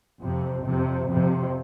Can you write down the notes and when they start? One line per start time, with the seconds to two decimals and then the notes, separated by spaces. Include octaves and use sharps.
0.22 F2 C3
0.65 F2 C3
1.09 F2 C3